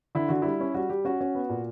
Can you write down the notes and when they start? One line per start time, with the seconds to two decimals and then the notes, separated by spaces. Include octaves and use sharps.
0.15 D3 E4
0.29 D3 F#4
0.42 G3 E4
0.60 C#4
0.74 G3 F#4
0.90 G3 G4
1.05 C#4 F#4
1.21 C#4
1.35 B3
1.49 A#2